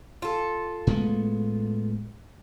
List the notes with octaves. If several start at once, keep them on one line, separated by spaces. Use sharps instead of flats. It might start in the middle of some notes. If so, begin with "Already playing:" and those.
F4 A4
A2 G#3 B3